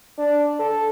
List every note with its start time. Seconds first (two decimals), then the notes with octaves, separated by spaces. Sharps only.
0.18 D4
0.60 A4